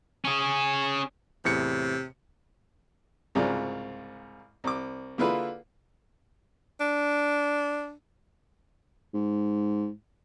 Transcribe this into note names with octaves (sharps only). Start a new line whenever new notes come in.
C#4 G#4
E2 A2 C3 C#7
C2 G#2 C#3 F4 D5 F6
C2 D6
D3 A#3 E4 F4 G#4 B4
D4
G#2